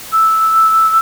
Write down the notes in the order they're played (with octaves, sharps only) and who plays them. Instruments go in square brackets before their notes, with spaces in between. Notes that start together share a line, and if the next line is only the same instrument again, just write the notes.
[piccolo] E6